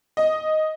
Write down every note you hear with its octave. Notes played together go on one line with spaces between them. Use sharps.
D#5